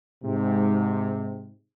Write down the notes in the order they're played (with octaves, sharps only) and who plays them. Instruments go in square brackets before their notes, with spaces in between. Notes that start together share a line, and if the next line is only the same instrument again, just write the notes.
[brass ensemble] G#2 C3